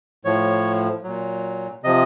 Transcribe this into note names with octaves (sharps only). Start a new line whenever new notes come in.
A2 F3 C#5
A#2 F#3
C3 F3 D#5